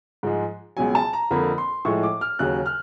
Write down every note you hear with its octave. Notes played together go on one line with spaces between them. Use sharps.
G#2 F3 G#3
C#2 B2 F#3 G#5
A5
A#5
F2 D3 F3 A#3 B5
C6
A2 F3 G#3 C#6
D6
F6
D#2 C#3 F#3 F#6
F6